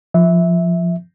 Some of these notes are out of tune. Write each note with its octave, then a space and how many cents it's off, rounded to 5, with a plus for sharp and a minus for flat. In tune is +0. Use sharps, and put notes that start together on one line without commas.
F3 +0 E5 -15